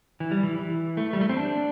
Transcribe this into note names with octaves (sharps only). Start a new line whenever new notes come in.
E3
G3
E3
E3
A3
G3
A3
C4
D4